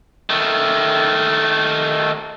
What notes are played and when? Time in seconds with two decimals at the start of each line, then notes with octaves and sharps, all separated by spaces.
0.30 D#3 A3